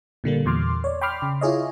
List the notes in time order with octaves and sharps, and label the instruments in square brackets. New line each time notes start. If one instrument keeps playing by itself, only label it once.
[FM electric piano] A#2 D3 G3 A#3
E2 A#2 C6 D6 F6
C#5 D5
G5 B5 C6 D6 F6
C#3
E4 F4 G#4 C#5 D#5